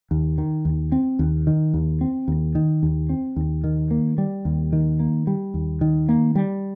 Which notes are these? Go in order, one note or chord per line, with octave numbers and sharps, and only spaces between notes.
D#2
D#3
D#2
C4
D#2
D#3
D#2
C4
D#2
D#3
D#2
C4
D#2
D#3
A#3
G3
D#2
D#3
A#3
G3
D#2
D#3
A#3
G3